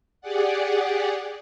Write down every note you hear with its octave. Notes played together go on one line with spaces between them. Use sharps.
G4 G#4 D5 F#5